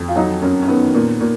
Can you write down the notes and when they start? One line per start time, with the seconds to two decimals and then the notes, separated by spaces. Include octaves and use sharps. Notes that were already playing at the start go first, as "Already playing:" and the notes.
Already playing: F2
0.08 F4
0.16 F#3 D#4
0.42 F#2 C#4
0.62 C#4
0.68 D#3 B3
0.94 A#2
1.21 A#2